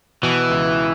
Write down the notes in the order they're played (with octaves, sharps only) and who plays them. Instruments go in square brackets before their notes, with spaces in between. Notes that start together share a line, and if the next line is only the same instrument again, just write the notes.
[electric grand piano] B2 [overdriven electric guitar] E3
[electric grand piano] C#2